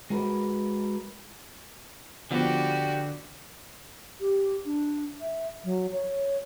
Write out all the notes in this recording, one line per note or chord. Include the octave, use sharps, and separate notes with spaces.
G#3 F#4 A#4 B4
D3 F3 B3 F#4 G4 D5
G4
D4
E5
F#3
C#5